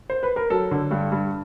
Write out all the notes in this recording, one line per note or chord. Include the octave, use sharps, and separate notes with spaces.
C5
B4
A#4
F#3 A4
D3
G2
G2